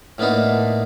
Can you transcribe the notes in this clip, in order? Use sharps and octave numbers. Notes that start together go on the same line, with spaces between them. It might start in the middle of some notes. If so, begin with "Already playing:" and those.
A2 A#3 B3 D4 D#4